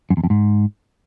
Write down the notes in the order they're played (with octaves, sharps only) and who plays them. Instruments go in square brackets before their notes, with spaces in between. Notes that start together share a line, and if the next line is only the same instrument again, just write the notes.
[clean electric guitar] F#2
E2
F2
G#2